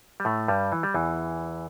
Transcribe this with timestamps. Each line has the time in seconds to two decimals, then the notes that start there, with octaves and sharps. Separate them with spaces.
0.20 G3
0.25 A2 A3
0.48 G2 G3
0.72 E3
0.83 G3
0.94 E2 E3